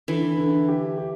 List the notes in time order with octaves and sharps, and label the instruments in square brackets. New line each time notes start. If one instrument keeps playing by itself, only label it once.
[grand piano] D3 [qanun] E3
[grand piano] D3
G4
G4